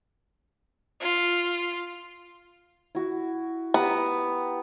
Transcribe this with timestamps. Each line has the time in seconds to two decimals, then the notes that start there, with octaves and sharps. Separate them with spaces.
0.99 F4
2.95 E4 F#4
3.74 B3 G4 A#5 B5